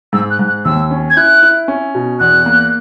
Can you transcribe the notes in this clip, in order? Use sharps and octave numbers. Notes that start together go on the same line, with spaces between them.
G#2 E6
F#6
G#2
F#6
D#2 E6
C#4
G#6
E4 F#6
E4
C#4
B2
E2 F#6
A#3